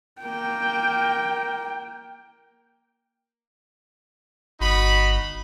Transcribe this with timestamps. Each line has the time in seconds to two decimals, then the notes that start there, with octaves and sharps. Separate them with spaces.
0.22 A#3 G5
4.60 G1 D#4 F#4 B5